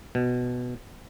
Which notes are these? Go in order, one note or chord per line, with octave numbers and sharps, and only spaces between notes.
B2